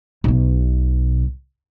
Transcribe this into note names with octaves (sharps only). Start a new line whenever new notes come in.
B1 B2